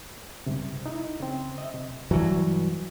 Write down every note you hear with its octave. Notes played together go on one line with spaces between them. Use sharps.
C#2 G2 C3
D#4 E4
C#3 C4
D#5 E5
C3
G2 E3 F#3